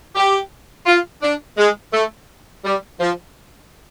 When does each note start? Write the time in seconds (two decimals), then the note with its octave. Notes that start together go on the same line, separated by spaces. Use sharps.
0.16 G4
0.86 F4
1.22 D4
1.58 G#3
1.93 A3
2.65 G3
3.00 F3